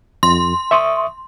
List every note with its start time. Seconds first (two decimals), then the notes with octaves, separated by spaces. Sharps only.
0.23 F2 C6
0.71 E5 C#6 D#6